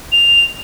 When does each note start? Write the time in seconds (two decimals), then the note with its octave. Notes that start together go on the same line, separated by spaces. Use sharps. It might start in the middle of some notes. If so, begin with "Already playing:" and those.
0.12 F7